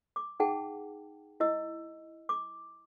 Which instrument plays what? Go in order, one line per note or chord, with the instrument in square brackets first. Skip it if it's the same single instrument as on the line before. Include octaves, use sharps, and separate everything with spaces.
[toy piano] D6
D#4 G#4 F#5 G5 A5
E4 D#5 E6
D6